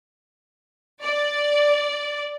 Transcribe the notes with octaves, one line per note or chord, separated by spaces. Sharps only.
D5